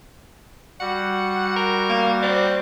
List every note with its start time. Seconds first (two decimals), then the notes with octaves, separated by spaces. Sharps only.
0.80 G3 F#4 F#5
1.56 A#4
1.89 A#3
2.22 C4 D5